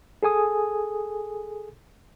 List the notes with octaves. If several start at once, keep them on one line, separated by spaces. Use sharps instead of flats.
G#4 A4 G#5 D#6